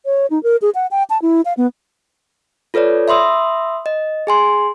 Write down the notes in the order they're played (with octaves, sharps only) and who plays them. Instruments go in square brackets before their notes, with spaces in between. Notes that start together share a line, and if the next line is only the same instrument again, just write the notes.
[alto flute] C#5
D#4
A#4
G#4
F#5
G5
A5
E4
F5
B3
[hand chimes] F4 A4 B4 C#5 D5
E5 B5 C6 D#6 E6
D#5
G#4 G#5 C6